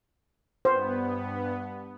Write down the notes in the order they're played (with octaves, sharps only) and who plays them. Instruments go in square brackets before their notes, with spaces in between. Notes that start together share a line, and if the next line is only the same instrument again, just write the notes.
[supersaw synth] G2 B3 [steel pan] C5